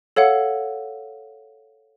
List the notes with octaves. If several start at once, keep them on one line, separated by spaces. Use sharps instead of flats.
A4 C#5 F5 F#5